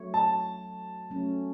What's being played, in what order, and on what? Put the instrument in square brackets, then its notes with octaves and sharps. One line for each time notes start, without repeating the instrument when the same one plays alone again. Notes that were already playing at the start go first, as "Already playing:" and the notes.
Already playing: [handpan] F#3 A3 E4 C#5
[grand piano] A5
[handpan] F#3 A3 C#4